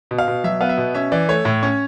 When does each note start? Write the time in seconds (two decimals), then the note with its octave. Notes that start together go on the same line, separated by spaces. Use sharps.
0.11 B2
0.18 F5
0.28 B2
0.44 F#3 E5
0.61 B3 F5
0.69 E5
0.78 B2
0.95 C#4 E5
1.12 E3 D5
1.29 A3 C#5
1.45 A2
1.63 C#4